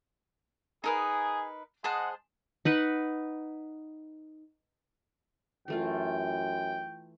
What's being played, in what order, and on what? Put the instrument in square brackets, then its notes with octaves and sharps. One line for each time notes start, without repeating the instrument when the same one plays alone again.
[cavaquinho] D#4 A#4 B4 [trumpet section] G#4
[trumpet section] G#3 D#5 F#5 [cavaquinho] G#4 C5 A5
[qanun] D#4 B4 F#5
[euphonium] F#2 [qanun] E3 A3 F4 [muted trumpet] G5